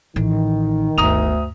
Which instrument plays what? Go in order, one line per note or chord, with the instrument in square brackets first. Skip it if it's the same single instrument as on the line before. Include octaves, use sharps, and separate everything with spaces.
[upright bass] A1 [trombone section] D#3
[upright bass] G1 [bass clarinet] D2 [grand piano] A#5 D#6 F7